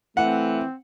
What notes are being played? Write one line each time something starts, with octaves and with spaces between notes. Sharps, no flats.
E3 A3 C4 F#5